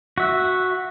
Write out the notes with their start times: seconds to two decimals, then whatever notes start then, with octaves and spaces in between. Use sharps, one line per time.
0.18 F#4 E5